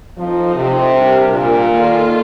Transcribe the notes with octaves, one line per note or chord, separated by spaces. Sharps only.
F3 C4 D#4 A4 C5
C3
G3 D4 G4 A#4
A#2
D#3 A#3 F4 A4